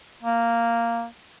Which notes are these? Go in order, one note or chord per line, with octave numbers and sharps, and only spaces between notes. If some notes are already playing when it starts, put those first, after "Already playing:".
A#3